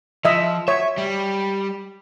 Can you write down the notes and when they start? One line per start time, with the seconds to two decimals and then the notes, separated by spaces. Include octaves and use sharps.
0.25 F3 D#5 E5
0.68 C#5 E5
0.98 G3